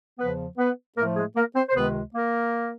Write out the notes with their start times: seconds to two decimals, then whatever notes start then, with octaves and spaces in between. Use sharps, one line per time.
0.18 E2 C#3 F3 B3 B4
0.58 B3 B4
0.97 A2 F3 A3 A#3 A#4
1.16 G#3 G#4
1.36 A#3 A#4
1.55 C4 C5
1.69 C5
1.75 C#2 C3 D#3 G#3 B3 B4
2.14 A#3 A#4